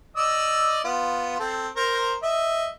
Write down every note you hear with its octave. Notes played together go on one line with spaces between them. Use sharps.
D5 D#5 E6
B3 F4
C4 A4
A#4 C5 A#5
D#5 E5